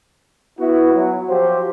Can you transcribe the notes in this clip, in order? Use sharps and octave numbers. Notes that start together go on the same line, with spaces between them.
B3 E4 F#4
F#3
F3 F#3 G4 C5